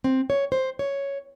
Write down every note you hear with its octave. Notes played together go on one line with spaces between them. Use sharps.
C4
C#5
C5
C#5